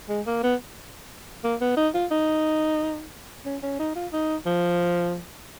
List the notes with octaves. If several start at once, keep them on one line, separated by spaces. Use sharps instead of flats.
G#3
A#3
B3
A#3
B3
D#4
F4
D#4
C#4
C#4
D#4
F4
D#4
F3